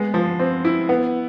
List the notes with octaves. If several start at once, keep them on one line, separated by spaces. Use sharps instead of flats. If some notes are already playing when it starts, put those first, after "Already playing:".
Already playing: G#3 B3
F3
C4
E4
B3